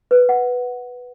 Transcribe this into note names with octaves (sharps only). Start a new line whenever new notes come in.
B4
F#5